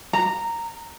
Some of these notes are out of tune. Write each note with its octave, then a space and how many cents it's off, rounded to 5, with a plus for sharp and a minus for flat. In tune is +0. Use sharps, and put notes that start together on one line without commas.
A#5 -10